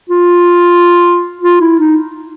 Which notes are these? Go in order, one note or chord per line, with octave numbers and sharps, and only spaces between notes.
F4
F4
E4
D#4